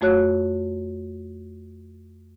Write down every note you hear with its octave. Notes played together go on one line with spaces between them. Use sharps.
F2 A3 F#4 C#5 F#6